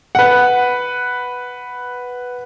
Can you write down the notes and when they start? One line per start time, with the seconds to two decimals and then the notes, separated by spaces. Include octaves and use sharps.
0.15 B4 F#5